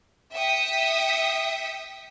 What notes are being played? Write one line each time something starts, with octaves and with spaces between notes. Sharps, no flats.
E5 G5 D#6 B6 C#7